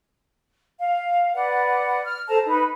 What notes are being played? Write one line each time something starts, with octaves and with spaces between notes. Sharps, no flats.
F5
B4 D5 F#5
F6
A4 C5 A5 A#5
D#4 B4